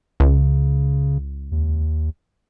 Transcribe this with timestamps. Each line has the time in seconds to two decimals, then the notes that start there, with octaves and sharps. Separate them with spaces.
0.20 C#2 C#3
1.51 D#2